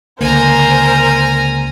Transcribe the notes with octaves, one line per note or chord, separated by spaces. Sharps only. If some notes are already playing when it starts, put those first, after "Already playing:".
C#2 D3 A#3 A#4 C5 G#5 A#5